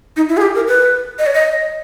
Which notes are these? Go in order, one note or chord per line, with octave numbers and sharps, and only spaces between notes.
D#4
E4
G#4
G4
A#4
B4
D#5
C#5
D#5